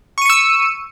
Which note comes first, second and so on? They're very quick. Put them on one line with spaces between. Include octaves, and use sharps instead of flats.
C#6 D#7 C#7 E6